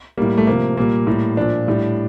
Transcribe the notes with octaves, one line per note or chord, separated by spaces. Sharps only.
A2 G3 A#3
A3
C3 F3 A#3
A#2 G3 A#3
A2 G3
A#2 F3 D4
A2 G3